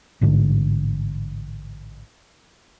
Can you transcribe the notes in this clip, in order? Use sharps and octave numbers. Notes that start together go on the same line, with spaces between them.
A1 G#2 D3